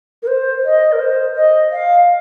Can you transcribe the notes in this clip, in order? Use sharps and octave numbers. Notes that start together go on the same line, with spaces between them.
A#4
C5
D#5
A#4
C5
D#5
F5